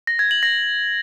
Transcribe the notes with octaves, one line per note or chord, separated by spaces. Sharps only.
A#6
G#6
F#7
A#6